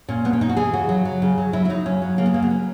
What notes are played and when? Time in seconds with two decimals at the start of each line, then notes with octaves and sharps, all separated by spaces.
0.09 A#2 C#4
0.25 B2 B3
0.33 C#4
0.41 B2 D#4
0.49 F#4
0.57 E3 G#4
0.73 C#3 F#4
0.89 F#3
1.05 F#3
1.22 C#3
1.38 F#3
1.53 F#3 E4
1.65 E4
1.70 F#3 D#4
1.86 C#3 C#4
2.02 F#3
2.18 C#3 A#3
2.26 B3
2.34 F#3 A#3
2.42 B3
2.50 F#3 C#4